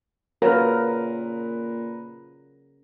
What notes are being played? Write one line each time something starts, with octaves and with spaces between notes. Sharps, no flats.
A#2 C#3 F#3 A#4 B4 A#5